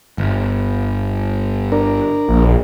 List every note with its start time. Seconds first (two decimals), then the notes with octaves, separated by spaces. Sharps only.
0.18 G1
1.72 D4 A#4
2.28 A#1